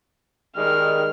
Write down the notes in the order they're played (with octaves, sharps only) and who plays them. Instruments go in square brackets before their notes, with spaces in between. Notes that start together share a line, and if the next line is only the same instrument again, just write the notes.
[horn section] D#3 G3 G#3 [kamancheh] F6